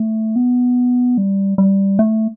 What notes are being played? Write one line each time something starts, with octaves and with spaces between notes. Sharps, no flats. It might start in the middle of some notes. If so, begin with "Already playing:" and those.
Already playing: A3
B3
G3
G3
A3